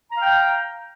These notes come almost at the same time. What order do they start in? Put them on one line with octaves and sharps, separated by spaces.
A#5 F5 G5